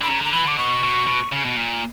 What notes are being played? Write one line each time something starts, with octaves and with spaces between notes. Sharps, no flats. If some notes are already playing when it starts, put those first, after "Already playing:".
D3 B5
C#3 A#5
D3 A#5
E3 B5
D3 D6
B2 C#6
B2
B2
C#3
B2
A#2